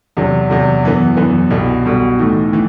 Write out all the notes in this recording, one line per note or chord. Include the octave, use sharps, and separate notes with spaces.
E2 C3 F#3
E2 C3 F#3
F#2 E3 B3
F#2 E3 B3
C2 B2 G3
C2 B2 G3
A2 E3 A3 D#4
A2 E3